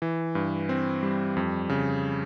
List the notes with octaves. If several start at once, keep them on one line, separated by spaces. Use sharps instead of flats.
E3
G2
C4
G3
F2
C#3